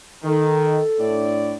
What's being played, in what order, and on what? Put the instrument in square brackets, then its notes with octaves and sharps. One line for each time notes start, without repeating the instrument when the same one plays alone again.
[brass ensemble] D#3 [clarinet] A4
[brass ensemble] A2 D4 D5